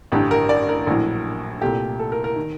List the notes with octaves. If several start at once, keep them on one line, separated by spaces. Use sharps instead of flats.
A1 G2 D3 G4
A#4
D5
A#4
A#1 A2 F#3
C2 A#2 A3 G4
A4
A#4
A#4
D#3